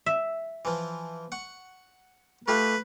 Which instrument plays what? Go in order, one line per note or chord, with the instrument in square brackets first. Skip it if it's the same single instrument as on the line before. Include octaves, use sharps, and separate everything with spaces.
[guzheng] E5
[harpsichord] E3 F3
F#5 C#6
[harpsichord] A3 F4 G4 [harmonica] B4